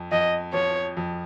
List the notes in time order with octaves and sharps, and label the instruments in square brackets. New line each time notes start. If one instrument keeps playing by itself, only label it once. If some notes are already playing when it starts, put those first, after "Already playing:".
Already playing: [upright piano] F2
[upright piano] F2 [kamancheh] D#5
[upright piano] F3 [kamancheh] C#5
[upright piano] F2